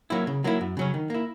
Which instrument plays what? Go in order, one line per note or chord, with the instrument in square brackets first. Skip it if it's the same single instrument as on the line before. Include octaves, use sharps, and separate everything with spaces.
[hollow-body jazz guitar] F#3 A#3 E4
C#3
F#3 A#3 E4
F#2
C#3 F#3 C#4
D#3
A#3 E4